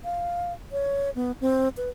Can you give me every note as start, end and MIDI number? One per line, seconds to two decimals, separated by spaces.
0.04 0.53 77
0.72 1.10 73
1.15 1.32 59
1.41 1.69 60
1.77 1.89 71